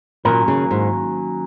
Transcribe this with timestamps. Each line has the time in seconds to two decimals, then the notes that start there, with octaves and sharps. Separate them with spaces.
0.25 A#2 D#3 F#3 A#3 C#4 A#4
0.48 C#3
0.71 G#2